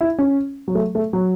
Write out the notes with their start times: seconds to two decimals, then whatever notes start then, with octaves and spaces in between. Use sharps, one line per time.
0.01 E4
0.19 C#4
0.68 F#3
0.75 A3
0.95 A3
1.13 F#3